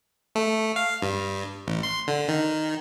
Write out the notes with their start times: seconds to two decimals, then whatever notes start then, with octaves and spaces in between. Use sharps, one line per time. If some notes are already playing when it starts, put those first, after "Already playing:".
0.35 A3
0.76 F5
1.02 G2
1.67 A1
1.83 C6
2.08 D3
2.28 D#3